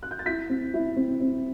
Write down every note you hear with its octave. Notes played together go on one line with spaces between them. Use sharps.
F#6
G6
A6
E4 G6 B6
C4
E4
C4
C4